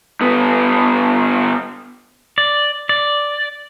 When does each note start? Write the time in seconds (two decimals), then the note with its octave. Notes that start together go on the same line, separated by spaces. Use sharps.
0.21 G2 B3
2.38 D5
2.89 D5